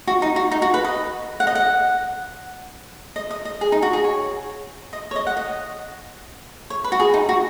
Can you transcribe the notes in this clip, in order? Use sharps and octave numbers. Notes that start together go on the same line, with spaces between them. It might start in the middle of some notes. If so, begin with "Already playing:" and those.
F#4
D#4
F#4
D#4
F#4
B4
D#5
F#5
D#5
F#5
D#5
D#5
D#5
G#4
D#4
F#4
G#4
C#5
D#5
C#5
D#5
F#5
D#5
C#5
B4
F#4
G#4
D#4
F#4